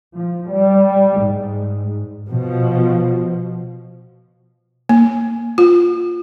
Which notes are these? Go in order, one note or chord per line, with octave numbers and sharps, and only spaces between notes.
F3
G3
G#2
B2 F3
A#3
F4